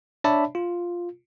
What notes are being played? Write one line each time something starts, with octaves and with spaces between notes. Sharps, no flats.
D4 C#5 D5 E5 A5 B5
F4